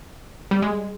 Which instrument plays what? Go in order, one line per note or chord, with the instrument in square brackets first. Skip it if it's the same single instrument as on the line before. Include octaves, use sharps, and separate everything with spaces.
[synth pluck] G3
G#3